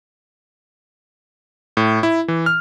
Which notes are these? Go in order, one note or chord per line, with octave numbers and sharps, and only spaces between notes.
A2
E4
E3
F6